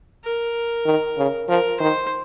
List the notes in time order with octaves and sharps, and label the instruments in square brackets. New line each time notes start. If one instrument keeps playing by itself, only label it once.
[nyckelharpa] A#4
[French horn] D#3
C#3
[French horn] F3 [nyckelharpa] A#4
[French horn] D#3 [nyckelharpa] C5